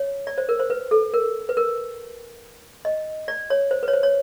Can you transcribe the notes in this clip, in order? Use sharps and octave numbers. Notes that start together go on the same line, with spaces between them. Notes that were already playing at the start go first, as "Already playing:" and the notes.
Already playing: C#5
D5
C5
A#4
C5
B4
A4
A#4
B4
A#4
D#5
D5
C#5
C5
B4
C#5
C5
C#5